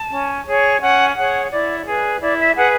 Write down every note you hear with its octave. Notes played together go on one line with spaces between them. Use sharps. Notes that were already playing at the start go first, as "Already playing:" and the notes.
Already playing: A5
C#4
G#4 C#5
C#4 F#5
G#4 C#5 F#5
E4 D5
G#4 B4
E4 D5
E5
G#4 B4 F#5